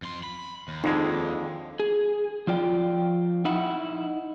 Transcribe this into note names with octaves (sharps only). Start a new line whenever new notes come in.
F2 C6
B5
D#2
F2 D3 G#3 D#4
G#4
F3 F4 D5 G5
D#4 E4 F#5